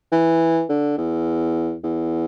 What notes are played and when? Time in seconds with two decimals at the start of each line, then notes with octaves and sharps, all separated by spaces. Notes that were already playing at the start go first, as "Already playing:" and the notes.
0.12 E3
0.70 D3
0.98 E2
1.84 E2